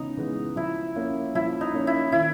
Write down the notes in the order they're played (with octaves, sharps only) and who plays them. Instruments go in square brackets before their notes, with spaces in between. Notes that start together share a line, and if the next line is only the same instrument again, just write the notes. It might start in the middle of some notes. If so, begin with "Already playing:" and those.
Already playing: [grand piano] C#3 E3 G#3 B3 [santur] D#4
[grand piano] E3 G#3 B3
[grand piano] F3 [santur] E4
[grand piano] A#3 C#4
[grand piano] F3 [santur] E4
[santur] D#4
[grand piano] A#3 C#4
[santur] E4
[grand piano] D#3 [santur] E4